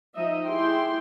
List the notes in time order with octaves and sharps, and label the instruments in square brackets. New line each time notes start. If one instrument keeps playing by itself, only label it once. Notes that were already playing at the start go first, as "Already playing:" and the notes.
[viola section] F3 D#4 D#5 E5
E4 G4 G#4 G5 C6